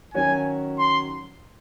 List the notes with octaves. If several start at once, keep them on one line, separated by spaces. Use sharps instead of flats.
D#3 F#3 C#4 F#4 G#5
C6